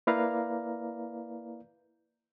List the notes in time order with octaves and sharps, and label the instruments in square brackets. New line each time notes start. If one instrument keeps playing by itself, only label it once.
[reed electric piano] A#3 E4 B4 D5 F5 A#5